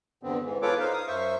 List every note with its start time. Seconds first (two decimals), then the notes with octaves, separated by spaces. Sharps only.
0.23 E2 G2 D3 B3 C4
0.44 G#2 E3
0.62 E2 F4 A4 B4 C#5 D6
0.79 D#4 C5 F5
0.93 F5 D#6
1.07 F#2 C5 E5 C#6